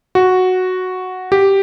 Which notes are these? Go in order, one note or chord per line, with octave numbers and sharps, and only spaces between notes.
F#4
G4